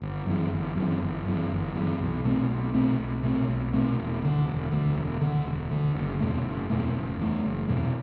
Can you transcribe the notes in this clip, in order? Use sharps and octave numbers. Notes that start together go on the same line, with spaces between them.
G1
F#2 E3
G1
F#2 E3
G1
F#2 E3
G1
F#2 E3
B1
B2 A3 C4
B1
B2 A3 C4
B1
B2 A3 C4
B1
B2 A3 C4
E1
D2 D3
E1
D2 D3
E1
D2 D3
E1
D2 D3
F#1
E2 B2 A3
F#1
E2 B2 A3
F#1
E2 B2 A3
F#1
E2 B2 A3